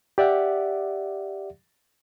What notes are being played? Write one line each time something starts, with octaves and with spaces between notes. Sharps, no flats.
G4 D5 E5 F#5